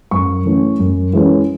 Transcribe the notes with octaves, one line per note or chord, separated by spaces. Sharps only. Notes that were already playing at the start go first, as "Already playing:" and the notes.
F#2 C#6
E3 A3 C#4
F#2
E3 G#3 C#4